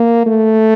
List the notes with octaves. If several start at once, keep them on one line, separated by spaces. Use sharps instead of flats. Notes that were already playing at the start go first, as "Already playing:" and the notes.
Already playing: A#3
A3